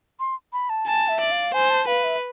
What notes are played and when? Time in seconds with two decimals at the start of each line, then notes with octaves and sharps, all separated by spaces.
0.20 C6
0.53 B5
0.70 A5
0.86 G#5 A5
1.08 E5
1.20 D5
1.31 F5
1.54 C5 G#5
1.70 A5
1.87 B4 F5
2.04 E5